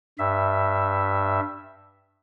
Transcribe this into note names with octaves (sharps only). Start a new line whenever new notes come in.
G2 E5